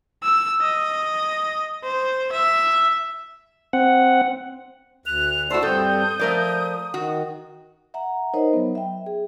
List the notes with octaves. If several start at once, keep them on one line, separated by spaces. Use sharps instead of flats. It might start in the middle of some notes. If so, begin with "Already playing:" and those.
E6
D#5
C5
E5
C4 F#5
D2 F#6 F7
A3 E4 F#4 C5 D5 A5 E6
G2 C4 A4 D#6 G6
F3 A3 A#4 D5
D#3 F#4
E5 F#5 A#5
D#4 A#4 C5 C#5 D#5
F#3 B3
E5 G5
G#4